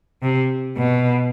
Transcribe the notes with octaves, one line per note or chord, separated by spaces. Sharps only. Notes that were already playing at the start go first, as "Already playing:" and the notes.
C3
B2